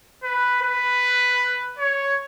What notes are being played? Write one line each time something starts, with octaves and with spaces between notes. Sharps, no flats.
B4
B4
C#5